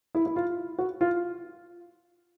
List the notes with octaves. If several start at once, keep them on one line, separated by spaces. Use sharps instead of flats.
E4
E4
F4
F#4
F4